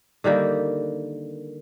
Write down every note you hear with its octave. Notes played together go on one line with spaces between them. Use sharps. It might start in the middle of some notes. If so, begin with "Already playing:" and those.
D3 D#3 G3 A#3